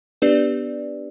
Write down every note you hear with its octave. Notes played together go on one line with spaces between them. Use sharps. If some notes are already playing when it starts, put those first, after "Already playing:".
B3 D4 G4 B4 D5